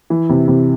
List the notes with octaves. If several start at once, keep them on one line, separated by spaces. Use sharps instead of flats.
E3
C3
C3